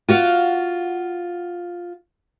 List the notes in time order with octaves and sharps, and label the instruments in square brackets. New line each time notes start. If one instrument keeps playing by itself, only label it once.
[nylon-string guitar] F4 F#4 F5